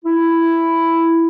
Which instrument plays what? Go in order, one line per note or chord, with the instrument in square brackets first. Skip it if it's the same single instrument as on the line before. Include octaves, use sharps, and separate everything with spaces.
[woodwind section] E4